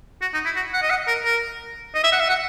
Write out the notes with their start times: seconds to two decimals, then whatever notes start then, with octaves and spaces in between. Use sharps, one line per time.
0.22 F#4
0.34 D#4
0.45 E4
0.56 F#4
0.73 F#5
0.82 D#5
0.90 F#5
1.07 A#4
1.25 A#4
1.95 D#5
2.04 E5
2.12 F#5
2.20 E5
2.29 F#5